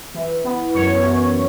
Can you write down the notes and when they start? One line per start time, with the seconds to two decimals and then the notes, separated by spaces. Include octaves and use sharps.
0.14 E3
0.44 B3
0.74 F#2 C#5
1.05 F#2